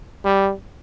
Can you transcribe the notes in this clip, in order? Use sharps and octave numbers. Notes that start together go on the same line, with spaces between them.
G3